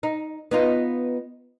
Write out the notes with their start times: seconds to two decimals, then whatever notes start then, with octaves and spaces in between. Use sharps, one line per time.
0.03 D#4
0.51 B3 D#4 F4